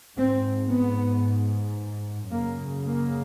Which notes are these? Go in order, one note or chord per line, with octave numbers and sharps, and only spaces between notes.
G#2 C4
B3
F#2 C#3 A#3
A#3